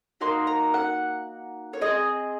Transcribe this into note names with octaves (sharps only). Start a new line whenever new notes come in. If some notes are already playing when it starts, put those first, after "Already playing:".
A#3 D#4 F#4 C6
A#5
F#5
C#5
C4 F4 G#4 D#5